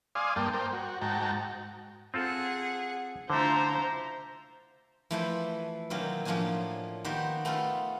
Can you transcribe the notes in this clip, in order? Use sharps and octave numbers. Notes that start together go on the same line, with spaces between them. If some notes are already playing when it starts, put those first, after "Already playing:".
D5 F5 G#5 C6 D#6
G2 A#3 G5 A5
A#4 C5 G5
F#4
G#2 F#4 G5 A5 A#5
C4 F4 G#4 A4 F#5
D3 A3 E4 F4 C5 A#5
E3 F3 A3 E4 B4 C5
B2 D#3 F#3 A#3 C4 C#4
A2 F3 A#3 C#4 D4 G#5
D#3 A#3 B3 F#4 G4 C5
A3 B3 C#4 F4 A4